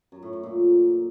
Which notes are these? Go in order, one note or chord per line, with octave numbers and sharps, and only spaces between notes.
F#2
A2
A2
A#2